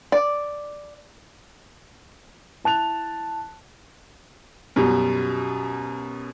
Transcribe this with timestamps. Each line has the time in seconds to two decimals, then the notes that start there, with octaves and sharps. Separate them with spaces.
0.12 D5
2.64 E4 A5 F#6 F7
4.76 F#2 B2 G3